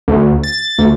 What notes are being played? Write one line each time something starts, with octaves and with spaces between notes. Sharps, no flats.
D2
A6
D2